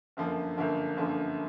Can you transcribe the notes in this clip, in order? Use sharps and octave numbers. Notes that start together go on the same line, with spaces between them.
G1 F#2 D3 F3 A#3
G1 F#2 D3 F3 A#3
G1 F#2 D3 F3 A#3